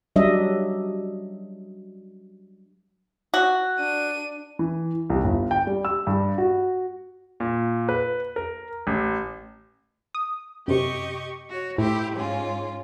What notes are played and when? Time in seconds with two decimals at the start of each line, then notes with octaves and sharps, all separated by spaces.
0.16 F#3 G3 D4 D#5 E5
3.34 F#4
3.79 D4 D#7
4.59 E3
5.10 C2
5.24 G1
5.51 G5
5.67 G3
5.85 E6
6.07 G2
6.38 F#4
7.40 A#2
7.89 B4
8.36 A#4
8.87 A1
10.15 D#6
10.68 F#2 C3 G4 D#5 C#6
11.49 F#4 C#5
11.78 A2 E4 G4 C5
12.14 G#2 C#4 F4